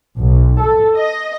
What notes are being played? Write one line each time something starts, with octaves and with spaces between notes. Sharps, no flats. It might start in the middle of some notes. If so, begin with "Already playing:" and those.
B1
A4
D#5